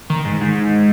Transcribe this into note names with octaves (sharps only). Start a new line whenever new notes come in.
D#3
G#2
G#2